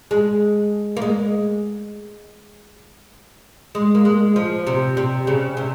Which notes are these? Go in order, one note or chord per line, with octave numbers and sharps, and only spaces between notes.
G#3
A#3
G#3
G#3
A#3
G#3
F3
C3
C3
C#3
C3